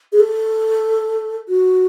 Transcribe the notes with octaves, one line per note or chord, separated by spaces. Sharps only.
G#4
A4
F#4